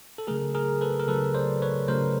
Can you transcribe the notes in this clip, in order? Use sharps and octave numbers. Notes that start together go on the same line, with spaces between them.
A4
C#3 F#3 A3 G#4 A#4
G#4 A#4
A4 B4
A#4
C#3 F#3 A3 A4 B4
C5 D5
B4 C#5
C#3 F#3 A3 A#4 C5